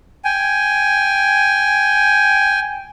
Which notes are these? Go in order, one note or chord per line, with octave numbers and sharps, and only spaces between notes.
G5 G#5